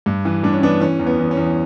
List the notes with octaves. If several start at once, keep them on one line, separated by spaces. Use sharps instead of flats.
G2
E3
G2 D4
C#4
E3 B3 D4
E3 C#4
E2
B3
E2
C#4
E2